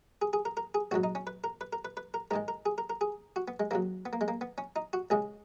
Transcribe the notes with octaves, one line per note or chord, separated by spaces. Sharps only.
G#4
G#4
A#4
A#4
G#4
A#1 G#2 F#3 F#4
D#4
C#4
B4
A#4
B4
A#4
B4
B4
A#4
G#2 D#3 G#3 A#4
A#4
G#4
A#4
A#4
G#4
F#4
B3
G#3
D#2 C#3 F#3 A#3
B3
A#3
G#3
A#3
B3
C#4
D#4
F#4
C#2 C#3 G#3 G#4